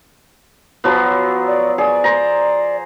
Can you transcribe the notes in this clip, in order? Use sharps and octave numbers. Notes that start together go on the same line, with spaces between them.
F3 F#3 B3
D5
G#4 D5
C5 A#5